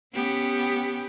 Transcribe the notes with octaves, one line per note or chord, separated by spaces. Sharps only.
B3 C#4 G4